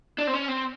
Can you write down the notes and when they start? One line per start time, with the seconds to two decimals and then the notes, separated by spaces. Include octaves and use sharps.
0.18 D4
0.27 C4
0.33 C#4
0.48 C4